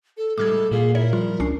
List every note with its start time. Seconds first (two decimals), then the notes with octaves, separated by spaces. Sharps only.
0.17 A4
0.38 A2 G3 G#3 A4 D6 F6 G#6
0.71 A#2 A#3 E4 F4 G#4
0.95 E4 A#4 C#5
1.13 F3 G3 F4
1.40 C#2 C#4 D4 C7